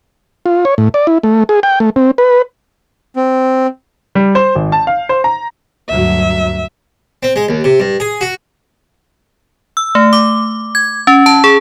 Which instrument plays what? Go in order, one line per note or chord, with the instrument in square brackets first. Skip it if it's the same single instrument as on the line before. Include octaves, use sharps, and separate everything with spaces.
[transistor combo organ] F4
C#5
A2
D5
E4
A3
G#4
G5
A3
C4
B4
[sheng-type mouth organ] C4
[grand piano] G3
C5
G#1
A5
F5
C5
A#5
[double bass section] D2 G2 F#3 [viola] E5
[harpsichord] C4
G#3
D#2
C3
G2
G#4
F#4
[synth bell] E6
A3
D6
G#6
C#4
A5
G#4